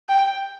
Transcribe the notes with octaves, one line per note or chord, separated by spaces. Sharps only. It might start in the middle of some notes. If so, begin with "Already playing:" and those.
G5